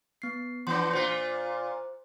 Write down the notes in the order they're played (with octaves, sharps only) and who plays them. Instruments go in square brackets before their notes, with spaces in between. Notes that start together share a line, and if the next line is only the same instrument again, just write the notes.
[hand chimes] B3 C7
[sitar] E3 B3 D4 [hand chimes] C6 G6
[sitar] A#2 F4 [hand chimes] C5